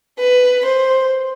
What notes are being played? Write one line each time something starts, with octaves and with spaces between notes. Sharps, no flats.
B4
C5